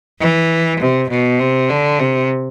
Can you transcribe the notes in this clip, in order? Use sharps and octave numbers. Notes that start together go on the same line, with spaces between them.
E3
C3
B2
C3
D3
C3